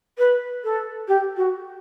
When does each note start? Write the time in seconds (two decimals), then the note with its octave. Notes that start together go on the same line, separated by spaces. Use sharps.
0.18 B4
0.64 A4
1.08 G4
1.37 F#4